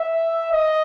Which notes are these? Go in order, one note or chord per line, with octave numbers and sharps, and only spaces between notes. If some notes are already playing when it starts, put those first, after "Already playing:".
Already playing: E5
D#5